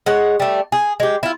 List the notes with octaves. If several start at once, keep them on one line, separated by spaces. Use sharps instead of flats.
G#3 C#5 F#5
G3 A3
G#4
G#3 G4
E4 F4